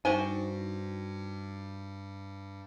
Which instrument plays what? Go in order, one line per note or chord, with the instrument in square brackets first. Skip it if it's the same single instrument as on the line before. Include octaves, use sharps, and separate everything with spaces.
[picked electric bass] G2 [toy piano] D4 D#4 C5 [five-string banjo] F#4 G4 G#5